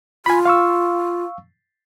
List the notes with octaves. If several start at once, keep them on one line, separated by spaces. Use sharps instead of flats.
F4 G#5 B5
F5 C#6 E6